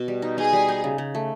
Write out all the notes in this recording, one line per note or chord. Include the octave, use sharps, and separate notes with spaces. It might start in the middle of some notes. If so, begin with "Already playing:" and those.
Already playing: B2
G3
D#4
D#4 G#4
G3
D#4
C#3
C#3
A3